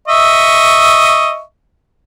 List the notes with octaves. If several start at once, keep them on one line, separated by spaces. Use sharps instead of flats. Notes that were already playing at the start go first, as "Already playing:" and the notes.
D#5 E5 C#6